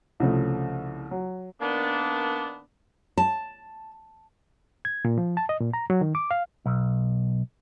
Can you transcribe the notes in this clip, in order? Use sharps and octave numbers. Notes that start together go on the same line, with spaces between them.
C2 C#3 F3 A3
F#3
D#3 A#3 B3 D4
A5
G#6
A#2
F3
A5
D#5
A#2
A#5
F#3
D#3
D6
F5
B1